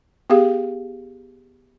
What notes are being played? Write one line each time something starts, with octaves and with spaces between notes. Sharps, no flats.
B3 G4 G#4 F5